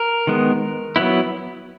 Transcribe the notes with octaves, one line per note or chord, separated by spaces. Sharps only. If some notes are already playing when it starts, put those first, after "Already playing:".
Already playing: A#4
D#3 G#3 B3
F#3 B3 E4